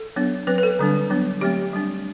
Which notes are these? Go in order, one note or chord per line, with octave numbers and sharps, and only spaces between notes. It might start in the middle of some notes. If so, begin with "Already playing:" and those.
Already playing: A4
F#3 B3 D4
F#3 C4 B4
B4
A4
D3 G3 D4
F#3 B3 D4
F#3 A3 C4 G4
G3 D4